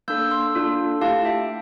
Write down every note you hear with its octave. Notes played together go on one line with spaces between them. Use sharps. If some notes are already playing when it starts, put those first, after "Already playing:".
A#3 D4 A4 E6 G6
C6 E6
A#3 D4 F4 A4
A3 E4 G4 F5 A5
E5 G5